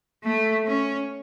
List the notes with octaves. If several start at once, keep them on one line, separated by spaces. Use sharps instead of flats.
A3
C#4